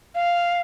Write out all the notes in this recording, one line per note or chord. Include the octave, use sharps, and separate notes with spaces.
F5